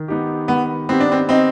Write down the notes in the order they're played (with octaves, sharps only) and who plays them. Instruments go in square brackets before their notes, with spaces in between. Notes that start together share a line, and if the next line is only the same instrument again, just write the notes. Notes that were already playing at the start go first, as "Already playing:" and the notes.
Already playing: [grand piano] D#3
B3 D#4 G4
[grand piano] D#3 [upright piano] B3
[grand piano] B3 D#4 G4 [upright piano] C4
[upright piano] D4
C4
C4 D#4